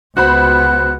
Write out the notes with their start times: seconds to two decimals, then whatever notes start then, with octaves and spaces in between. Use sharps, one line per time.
0.17 C#2 B3 F#4 C5 B5 F#6